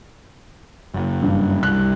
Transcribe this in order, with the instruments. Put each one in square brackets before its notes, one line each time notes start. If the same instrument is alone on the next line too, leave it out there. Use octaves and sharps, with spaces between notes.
[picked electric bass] F#1
[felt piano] G2
[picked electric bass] C2 [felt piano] F#6